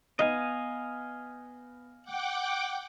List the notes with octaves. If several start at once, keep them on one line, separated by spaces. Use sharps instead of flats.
B3 D#4 D#5 F5 G#5
F#5 G5 D6